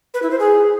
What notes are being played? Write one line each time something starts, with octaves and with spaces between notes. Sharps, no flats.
B4
E4
C5
G#4